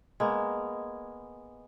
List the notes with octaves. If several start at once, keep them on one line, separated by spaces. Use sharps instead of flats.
G#3 A#3 B3